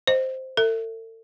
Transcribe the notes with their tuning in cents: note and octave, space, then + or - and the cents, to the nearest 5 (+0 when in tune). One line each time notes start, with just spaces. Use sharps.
C5 +0 D#5 +0
A4 +40 E5 +0